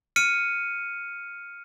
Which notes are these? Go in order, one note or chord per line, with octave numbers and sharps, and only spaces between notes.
F6 C#7 D#7